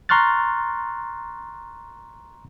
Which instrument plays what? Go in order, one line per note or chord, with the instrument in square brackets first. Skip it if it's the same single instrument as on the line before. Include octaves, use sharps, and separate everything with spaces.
[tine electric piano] A#5 C6 C#6 F6 F#6 A6